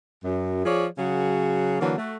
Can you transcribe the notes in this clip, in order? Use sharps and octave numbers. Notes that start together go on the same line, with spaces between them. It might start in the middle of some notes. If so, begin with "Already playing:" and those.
F#2
F3 G#4 C#5 D5
C#3 F#3 F#4 G#4
D3 E3 F#3 A#3
A3 F#4